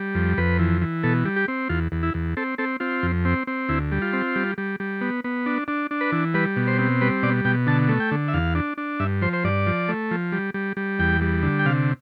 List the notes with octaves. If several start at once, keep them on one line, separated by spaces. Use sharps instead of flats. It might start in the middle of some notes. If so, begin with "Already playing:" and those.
Already playing: G3
F2
F2 B4
E3
E3
B2 A4
G3
G4
C4
E2 F4
E2
E4
E2
C4 A4
C4 A4
C4 F4
F2
C4
C4
D2 E4
G3
F4
C4
G3
G3
G3
B3
B3
D4
D4
D4
B4
E3
G3 B4
B2
C5
C4
G3 B4
B2 D5
B2 G5
D3 A5
A3
G5
D3
E5
E2 F5
D4
D4
G2 E5
F3 C5
C5
G2 D5
F3
A3
F3
G3
G3
G3
E2 G5
G3
D3
G5
C3 F5